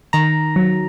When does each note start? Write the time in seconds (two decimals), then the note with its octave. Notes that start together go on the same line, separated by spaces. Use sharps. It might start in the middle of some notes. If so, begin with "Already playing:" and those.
0.13 D#3 A#5
0.56 F#3